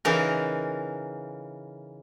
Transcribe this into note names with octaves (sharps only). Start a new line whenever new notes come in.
C#3 E3 D#4 A#4